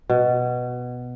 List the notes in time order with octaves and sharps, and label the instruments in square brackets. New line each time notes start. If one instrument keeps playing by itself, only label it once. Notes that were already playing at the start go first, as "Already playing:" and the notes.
[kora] B2